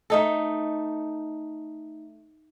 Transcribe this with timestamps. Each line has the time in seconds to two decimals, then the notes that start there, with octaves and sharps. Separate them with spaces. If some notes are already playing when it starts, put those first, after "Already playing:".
0.10 A3 D#4 A4